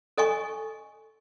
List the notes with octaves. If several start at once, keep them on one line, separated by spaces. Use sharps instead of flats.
A4 D#5 G#5 C#6